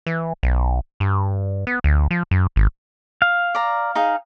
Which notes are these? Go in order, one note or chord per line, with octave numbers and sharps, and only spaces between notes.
E3
B1
G2
B3
D2
F3
F#2
G#1
F5
D5 A#5
D#4 G#4 F5